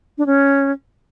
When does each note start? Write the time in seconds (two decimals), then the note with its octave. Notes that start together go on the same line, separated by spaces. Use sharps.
0.18 D4
0.26 C#4